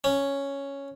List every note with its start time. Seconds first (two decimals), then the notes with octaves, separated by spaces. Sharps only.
0.04 C#4